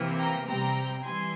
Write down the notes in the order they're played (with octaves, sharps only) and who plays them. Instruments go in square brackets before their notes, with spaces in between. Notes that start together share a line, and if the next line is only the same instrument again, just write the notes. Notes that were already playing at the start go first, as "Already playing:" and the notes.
Already playing: [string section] C3 E3 A#3
G5 A#5
C3 G3 C4 G5 A#5
E3 G3 G#5 C6